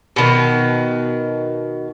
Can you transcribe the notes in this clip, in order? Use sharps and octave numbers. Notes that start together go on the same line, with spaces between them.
B2 D#3